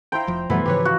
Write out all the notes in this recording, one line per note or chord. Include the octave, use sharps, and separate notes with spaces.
E4 C5 G5 A#5
F1 F3
F#2 B2 E3 F3 G3 A3 B3
G#2 C#3 F3 G4 B4 C#5
F#4